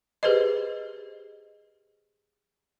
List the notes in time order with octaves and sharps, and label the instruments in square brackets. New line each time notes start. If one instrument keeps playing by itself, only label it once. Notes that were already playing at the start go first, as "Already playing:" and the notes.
[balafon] G4 G#4 B4 C5 D#5